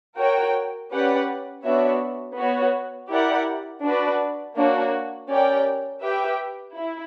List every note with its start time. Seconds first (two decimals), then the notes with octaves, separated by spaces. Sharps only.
0.17 F#4 A#4 C#5 G5
0.90 C#4 G4 B4 D5 F#5
1.63 B3 D4 F#4 C#5 E5
2.37 B3 F#4 C#5
3.10 E4 G4 A#4 D5 F#5
3.82 D4 F#4 B4 D5
4.56 A#3 D4 F#4 C#5
5.29 C#4 G4 A#4 D5 G5
6.02 G4 B4 E5 G5
6.76 E4